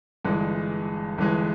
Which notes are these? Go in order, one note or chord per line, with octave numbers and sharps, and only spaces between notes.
G1 G2 E3 G#3
G1 G2 E3 G#3